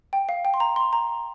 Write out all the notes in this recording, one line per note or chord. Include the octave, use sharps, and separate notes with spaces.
G5
F5
G5
C6
A#5
C6
A#5